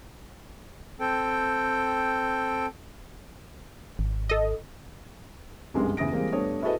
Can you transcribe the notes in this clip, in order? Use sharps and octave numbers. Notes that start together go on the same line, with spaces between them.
C4 A4 G5
G#1
A4 D#5
G1 C2 F#2 G#3 B3 C6
E2 C#3 E4 D#6 A#6 D7
E3 G3 G#3 A#3 C4
G2 A3 B3 C#5 D#6
E4 F#4 G#4 A4 B4 D#5